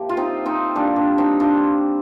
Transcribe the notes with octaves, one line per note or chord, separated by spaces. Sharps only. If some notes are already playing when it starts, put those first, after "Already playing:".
Already playing: A2 F3 A#3 G4
F4
C4 D#4
C4 D#4
D3 G3 A#3 D4
D4
C4 D#4
D4 F4